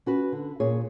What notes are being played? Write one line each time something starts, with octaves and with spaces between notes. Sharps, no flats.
C#4 F#4 B4
D3
A#2 G#4 C#5